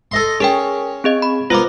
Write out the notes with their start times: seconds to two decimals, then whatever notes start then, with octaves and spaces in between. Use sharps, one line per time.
0.11 A4 D#5 C6
0.40 C#4 G#4 A#4 G5
1.04 C4 G#4 D#5
1.22 B5
1.50 A#3 B3 F4 C5 D6